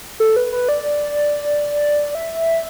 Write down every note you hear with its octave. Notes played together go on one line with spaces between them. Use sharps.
A4
B4
B4
D5
E5